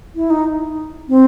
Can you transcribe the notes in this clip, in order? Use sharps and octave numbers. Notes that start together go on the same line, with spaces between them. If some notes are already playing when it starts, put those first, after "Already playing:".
E4
D#4
C4